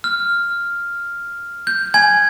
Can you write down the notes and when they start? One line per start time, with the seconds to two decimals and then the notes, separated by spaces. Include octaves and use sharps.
0.04 F6
1.67 G6
1.94 G#5 G#6